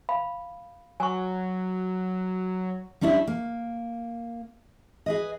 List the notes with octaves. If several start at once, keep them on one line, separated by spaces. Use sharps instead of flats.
F5 B5
F#3 G#5 C#6
G3 C#4 D4 E4
A#3
G#4 B4 D#5